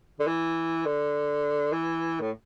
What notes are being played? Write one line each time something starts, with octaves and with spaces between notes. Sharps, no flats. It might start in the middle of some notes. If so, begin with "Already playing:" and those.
D3
E3
D3
E3
A2